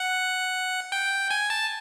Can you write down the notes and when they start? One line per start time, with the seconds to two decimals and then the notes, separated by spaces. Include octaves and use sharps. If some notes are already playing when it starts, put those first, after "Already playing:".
Already playing: F#5
0.92 G5
1.31 G#5
1.50 A5